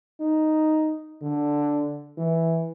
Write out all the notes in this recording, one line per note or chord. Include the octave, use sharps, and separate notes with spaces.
D#4
D3
E3